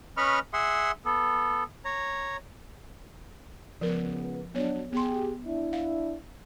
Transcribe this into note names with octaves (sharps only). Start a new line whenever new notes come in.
C#4 B4 D#5 B5 C#6 F6
G#4 E5 F#5 C6
B3 A4
C#5 A#5
C#2 C#3 F3 B3 A#4
F#3 B3 D4 C#5
B3 G4 G#4 C6
D4 E4
F5